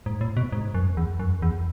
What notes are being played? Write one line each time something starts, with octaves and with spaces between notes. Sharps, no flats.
G#2
A2
B2
G#2
F#2
E2
F#2
E2